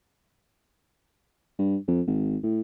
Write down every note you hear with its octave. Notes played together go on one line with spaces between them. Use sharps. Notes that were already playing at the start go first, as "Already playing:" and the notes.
G2
F2
G#1
A2